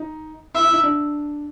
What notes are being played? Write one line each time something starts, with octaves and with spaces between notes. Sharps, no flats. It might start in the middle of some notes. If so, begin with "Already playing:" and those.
Already playing: D#4
E4 E5
E4
D#4
D4